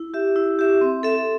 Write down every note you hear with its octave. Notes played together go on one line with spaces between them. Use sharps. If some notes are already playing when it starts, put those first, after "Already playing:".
Already playing: E4
G4 E5
E4
G4 E5
C4
A4 E5